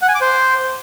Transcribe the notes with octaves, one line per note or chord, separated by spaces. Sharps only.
F#5
G#5
D6
C5